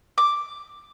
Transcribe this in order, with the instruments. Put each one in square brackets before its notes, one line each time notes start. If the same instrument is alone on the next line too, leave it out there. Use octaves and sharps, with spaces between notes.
[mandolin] D6